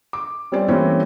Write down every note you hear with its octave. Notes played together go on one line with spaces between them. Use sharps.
D6
G3 C4 C#4 D5
E3 G3 A3 A#3 C4 C#4